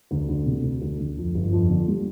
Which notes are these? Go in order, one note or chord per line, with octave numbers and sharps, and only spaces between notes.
D2
D2
C3
D2
D2
D2
F2
G1
F2
D3
G3